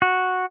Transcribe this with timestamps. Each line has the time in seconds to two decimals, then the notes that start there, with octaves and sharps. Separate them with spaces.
0.02 F#4